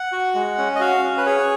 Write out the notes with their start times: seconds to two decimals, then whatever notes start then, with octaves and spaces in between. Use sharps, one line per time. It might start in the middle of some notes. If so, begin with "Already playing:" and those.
Already playing: F#5
0.12 F#4
0.35 G#3
0.58 C#4
0.76 D#5
0.80 F#4 F5
1.03 C#4
1.17 B4
1.26 G#4 C#5